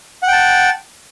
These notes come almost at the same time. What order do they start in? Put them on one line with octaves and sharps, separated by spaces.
F#5 G5 A5